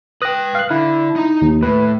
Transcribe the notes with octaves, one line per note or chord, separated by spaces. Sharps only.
B4 G5 D#6 F#6 A#6
F5 F#6
D3 E4
D#4 A#5
D#2
A2 B4